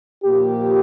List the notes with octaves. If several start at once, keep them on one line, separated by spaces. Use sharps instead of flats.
A#2 F3 A#3 G4